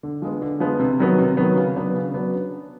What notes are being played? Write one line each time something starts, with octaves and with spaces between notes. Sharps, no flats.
D3
F3 G#3 B3
D3
F3 G#3 B3
C3
D#3 F#3 B3
C3
D#3 F#3 B3
C#3
F#3 B3 D4
C#3
F#3 B3 D4